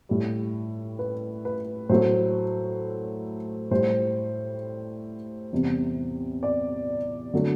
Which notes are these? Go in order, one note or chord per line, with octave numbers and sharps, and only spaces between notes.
A2 G3
B4
B4
A2 F#3 A3 C5
A2 G3 C5
E2 C3 G3
D5
D3 F#3 A3